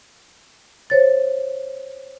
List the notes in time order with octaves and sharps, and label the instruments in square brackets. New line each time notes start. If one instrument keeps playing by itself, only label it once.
[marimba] C5 C#5 A6